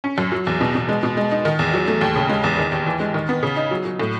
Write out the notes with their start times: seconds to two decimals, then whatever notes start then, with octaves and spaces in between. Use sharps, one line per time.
0.04 C#4
0.18 F#2
0.32 F#3
0.47 E2
0.61 B2
0.75 B2
0.89 G#3
1.03 B2
1.17 G#3
1.32 D#4
1.45 D#3
1.59 E2
1.74 F#3
1.88 A3
2.01 D#2
2.16 C#3
2.29 G#3
2.44 E2
2.58 D#3
2.72 D#2
2.86 E3
3.00 G#3
3.14 D#3
3.29 B3
3.43 C#3
3.56 D#4
3.71 F#3
3.85 F#3
4.00 A2